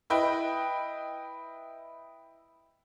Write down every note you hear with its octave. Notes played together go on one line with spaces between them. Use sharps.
E4 B4 D#5 G5